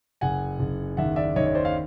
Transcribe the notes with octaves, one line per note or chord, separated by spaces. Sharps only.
F#1 F#5 G#5
F#1
D#2 E5 F#5
D5 E5
D#2 C#5 D#5
C#5
C5 D5
F5